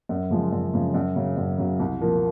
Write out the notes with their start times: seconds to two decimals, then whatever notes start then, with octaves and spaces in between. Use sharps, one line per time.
0.09 F#2
0.30 C#3 F3 G#3
0.52 F#2
0.74 C#3 F3 G#3
0.94 F#2
1.16 C#3 F#3
1.37 F#2
1.58 C#3 F#3
1.79 C2
2.01 A#2 F3 A#3